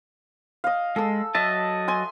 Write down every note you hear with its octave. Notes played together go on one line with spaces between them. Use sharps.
D#5 F5
G#3 A4 E6
F#3 D#5 E5 A5
G#5 C6